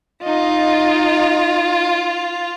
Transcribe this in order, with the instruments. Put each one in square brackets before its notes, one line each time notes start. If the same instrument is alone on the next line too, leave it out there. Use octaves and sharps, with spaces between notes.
[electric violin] D#4 D#5 [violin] F4